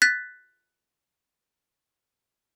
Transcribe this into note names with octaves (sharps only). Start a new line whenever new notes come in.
F#6 A6 B6